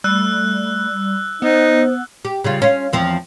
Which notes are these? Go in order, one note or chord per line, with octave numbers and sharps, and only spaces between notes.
G3 A3 E6 F#6
B3 D#4 C5
G4
C#3 G3 F4
C#4 F4
E2 F3 C4